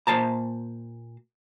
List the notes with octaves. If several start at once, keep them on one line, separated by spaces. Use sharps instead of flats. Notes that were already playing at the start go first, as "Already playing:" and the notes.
A#2 C5 A5 A#5